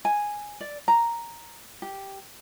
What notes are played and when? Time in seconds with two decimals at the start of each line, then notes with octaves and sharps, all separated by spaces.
0.05 G#5
0.61 D5
0.88 A#5
1.82 G4